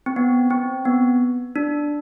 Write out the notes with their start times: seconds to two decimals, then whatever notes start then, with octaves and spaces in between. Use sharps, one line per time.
0.06 C4
0.16 B3
0.50 C4
0.85 B3
1.56 D4